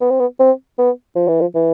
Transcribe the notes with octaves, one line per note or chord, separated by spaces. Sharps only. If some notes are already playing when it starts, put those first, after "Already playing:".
B3
C4
B3
C4
B3
F3
E3
F3
E3